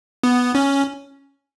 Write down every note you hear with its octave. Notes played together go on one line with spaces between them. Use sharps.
B3
C#4